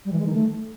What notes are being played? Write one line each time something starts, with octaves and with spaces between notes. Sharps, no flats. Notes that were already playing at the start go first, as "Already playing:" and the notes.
G3
E3
G#3
D#3
A3